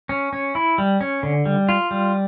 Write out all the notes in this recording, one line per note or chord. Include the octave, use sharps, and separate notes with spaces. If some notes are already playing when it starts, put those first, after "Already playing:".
C#4
C#4
E4
G3
C#4
D3
G3
F4
G3